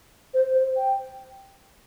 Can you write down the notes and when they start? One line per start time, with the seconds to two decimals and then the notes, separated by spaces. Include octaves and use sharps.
0.34 C5
0.55 C5
0.77 G5